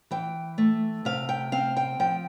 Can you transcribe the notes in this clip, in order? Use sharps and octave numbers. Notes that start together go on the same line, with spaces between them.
E3 G5
A3
C3 F5
G5
C4 F5
G5
F3 G5